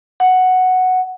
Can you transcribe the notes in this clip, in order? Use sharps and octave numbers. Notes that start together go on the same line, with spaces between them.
F#5